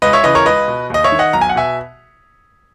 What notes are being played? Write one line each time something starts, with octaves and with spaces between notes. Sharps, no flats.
C#2 B4 D#5
C#5 E5
C#3 E3 B4 D#5
A#4 C#5
C#2 B4 D#5
B2
D#2 D#5
C#5 E5
D#3
D#5 F#5
B1 A#5
G#5
F#5
B2 E5 G#5